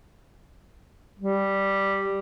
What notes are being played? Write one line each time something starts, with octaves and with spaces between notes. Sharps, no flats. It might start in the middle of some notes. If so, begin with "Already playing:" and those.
G3